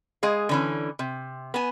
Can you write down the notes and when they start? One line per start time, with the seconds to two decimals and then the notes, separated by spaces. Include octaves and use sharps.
0.23 G#3 G#4 F5
0.49 D3 E3 C#4
0.99 C3
1.54 B3 G#5